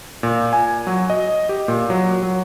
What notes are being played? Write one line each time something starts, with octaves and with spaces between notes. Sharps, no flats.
A#2
G#5
F#3
D#5
G4
A#2
F#3
F#3